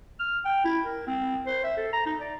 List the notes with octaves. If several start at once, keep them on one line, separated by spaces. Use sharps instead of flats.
F6
G5
E4
A#4
C4
C5
E5
A4
A#5
D#4
D5